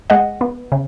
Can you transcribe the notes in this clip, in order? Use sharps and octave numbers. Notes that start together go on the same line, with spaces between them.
G#3 D#5 F#5
B3
C#3